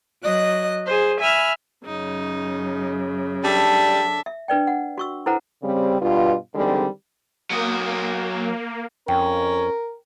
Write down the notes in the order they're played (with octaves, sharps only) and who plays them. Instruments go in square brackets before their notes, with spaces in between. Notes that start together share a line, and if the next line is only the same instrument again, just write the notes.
[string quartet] F#3 D#5 F#6
G#4 C5
E5 G#5 B5 F6
[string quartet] F#2 C#3 [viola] D#4
[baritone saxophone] G3 [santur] D4 [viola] A4 E5
[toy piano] E5
D4 B4 D5 G5
F#5
F#4 C#6 E6
E4 A4 B4 C5 F#5 A#5
[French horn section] C#3 G3 C4
G2 B2 F4
E2 D3 D#3 G3 G#3 C4
[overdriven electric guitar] F#3 D#5 [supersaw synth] A#3
[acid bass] F2 [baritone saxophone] C#4 [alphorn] A#4 [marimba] G5